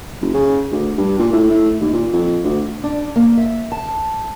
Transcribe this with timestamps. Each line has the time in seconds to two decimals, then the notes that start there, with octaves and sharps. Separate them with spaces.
0.21 F#1
0.34 C#3
0.72 D2
0.98 G2
1.19 A#2
1.32 A2
1.50 A2
1.80 D#2
1.93 A#2
2.13 F2
2.44 D2
2.84 D4
3.16 A#3
3.38 E5
3.72 A5